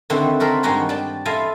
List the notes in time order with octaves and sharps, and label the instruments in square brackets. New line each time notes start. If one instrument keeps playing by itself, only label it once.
[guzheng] D3 D#3 C4 E4 F#4 B4
F#4 A4 A#4 C5 B5
G2 D#3 G#3 D#4 F#4 G#4
D5 G5 A5
E4 F4 A4 D#5 F5 G#5